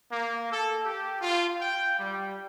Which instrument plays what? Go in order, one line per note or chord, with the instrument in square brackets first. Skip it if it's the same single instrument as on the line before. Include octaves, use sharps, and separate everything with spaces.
[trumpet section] A#3
A4
G4
F4
G5
G3